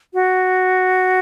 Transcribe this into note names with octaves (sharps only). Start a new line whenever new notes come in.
F#4